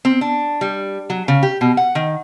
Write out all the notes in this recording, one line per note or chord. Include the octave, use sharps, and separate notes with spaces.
C4
D4
G3
F#3
C#3
G4
B2
F#5
D#3